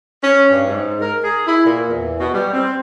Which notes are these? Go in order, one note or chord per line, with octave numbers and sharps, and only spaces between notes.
C#4
G2
G#2
A#4
G#4
E4
A#2
E2
B2
G3
C4